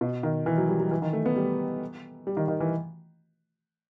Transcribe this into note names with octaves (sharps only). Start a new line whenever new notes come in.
B2
D#3
E3
F#3
G3
F#3
E3
D#3
A3
B3
G3
G3
D#3
D#3
E3